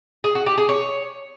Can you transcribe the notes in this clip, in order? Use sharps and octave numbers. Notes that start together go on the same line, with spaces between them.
G#4
F#4
G4
G#4
C#5